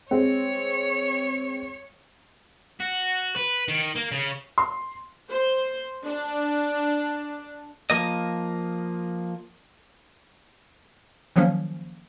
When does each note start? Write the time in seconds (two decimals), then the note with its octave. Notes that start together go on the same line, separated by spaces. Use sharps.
0.11 G#3 C4 C#5
2.80 F#4
3.36 B4
3.68 D#3
3.96 A#3
4.12 C#3
4.58 C6
5.30 C5
6.05 D4
7.90 F3 A#3 D#5
11.36 D#3 F3 F#3 A#3 C#4